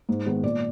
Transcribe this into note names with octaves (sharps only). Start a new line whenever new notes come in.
G#2
D#3 G#3 B3
A#2 D5